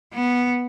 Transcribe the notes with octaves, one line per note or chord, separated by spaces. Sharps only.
B3